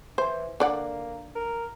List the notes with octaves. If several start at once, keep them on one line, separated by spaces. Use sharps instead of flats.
E3 C5
D3 A#3 D5 F#5
A#4